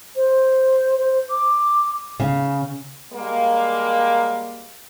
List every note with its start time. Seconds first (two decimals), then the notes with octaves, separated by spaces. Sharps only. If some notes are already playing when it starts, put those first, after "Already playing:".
0.16 C5
0.98 C5
1.30 D6
2.20 C#3
3.13 G3 G#3 A#3